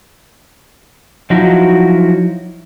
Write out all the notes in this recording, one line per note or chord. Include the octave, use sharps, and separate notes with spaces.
F3 F#3 D#4 E4 F#4